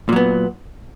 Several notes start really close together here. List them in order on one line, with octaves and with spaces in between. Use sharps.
A#2 F#3 B3